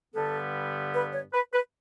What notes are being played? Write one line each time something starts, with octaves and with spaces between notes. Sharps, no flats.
G2 D3 G3 B3 A4
B4
C#5
B4
B4